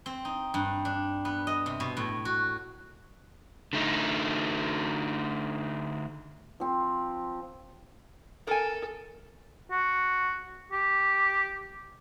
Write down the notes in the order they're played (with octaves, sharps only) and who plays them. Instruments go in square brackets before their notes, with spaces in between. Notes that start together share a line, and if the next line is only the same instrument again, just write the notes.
[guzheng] C4
D#4
G2
D4
B3
D#5
C3
B2
A2
F#4
[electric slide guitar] D3 A3 D#4
[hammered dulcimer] F3 C4
[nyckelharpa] A4 [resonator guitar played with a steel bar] A#4 G#5
[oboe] F#4
G4